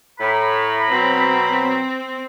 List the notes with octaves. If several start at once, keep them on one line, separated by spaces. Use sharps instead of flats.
A2 A#5 B5
B2 F#3 C4